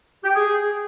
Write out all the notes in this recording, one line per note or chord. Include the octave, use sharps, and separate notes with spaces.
G4
G5
G#4